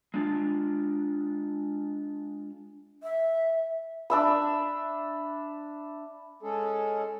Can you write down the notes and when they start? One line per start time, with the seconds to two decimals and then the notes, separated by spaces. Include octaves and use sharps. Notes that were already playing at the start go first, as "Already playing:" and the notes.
0.14 G#3 D4 F4
3.03 E5
4.10 D4 E5 B5
6.43 G#3 C#4 G#4 A4